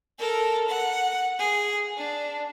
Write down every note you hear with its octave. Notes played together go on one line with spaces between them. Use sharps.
A4 A#4
F#5
G#4
D4